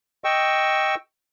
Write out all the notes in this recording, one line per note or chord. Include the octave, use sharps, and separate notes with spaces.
D#5 G5 C#6 E6